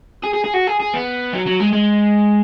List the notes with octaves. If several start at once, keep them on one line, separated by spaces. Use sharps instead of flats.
G#4
G#4
G#4
F#4
G#4
G#4
B3
F#3
F#3
G#3
G#3